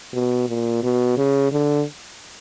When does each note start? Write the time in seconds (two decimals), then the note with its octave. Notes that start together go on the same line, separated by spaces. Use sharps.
0.13 B2
0.49 A#2
0.83 B2
1.17 C#3
1.52 D3